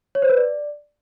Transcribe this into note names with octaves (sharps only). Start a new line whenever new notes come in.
C#5
C5
B4
D5